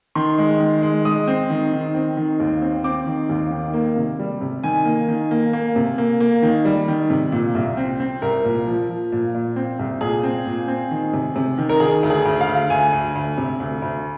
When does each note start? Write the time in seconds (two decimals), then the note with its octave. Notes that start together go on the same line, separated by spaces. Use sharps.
0.15 D#3 C6
0.38 G#3
0.60 D#3
0.82 G#3
1.05 G#3 D#6
1.27 C4
1.50 D#3
1.72 D#3
1.94 C4
2.17 D#3
2.40 D#2
2.62 C4
2.84 C4 D6
3.06 D#3
3.29 D#2
3.51 D#3
3.74 A#3
3.96 C3
4.19 G3
4.41 C3
4.63 D#3 G#5
4.85 A#3
5.08 D#3
5.31 A#3
5.53 A#3
5.76 C3
5.98 A#3
6.20 A#3
6.42 D#3
6.65 G3
6.88 D#3
7.10 C3
7.32 A#2
7.55 C2
7.77 C4
8.00 C4
8.22 C2 A#4
8.45 A#2
8.67 F3
8.89 F3
9.12 A#2
9.35 A#2
9.56 C4
9.79 C2
10.01 A#2 G#4
10.23 C4
10.46 A#2
10.68 C4
10.91 D#3
11.13 C3
11.36 C3
11.58 D#3
11.69 A#4
11.80 D#3 G#4
12.03 D2
12.10 G#4
12.25 D2
12.41 F5
12.48 D2
12.70 D2 G#5
12.93 D2
13.15 D2
13.38 C3
13.60 D2
13.82 D2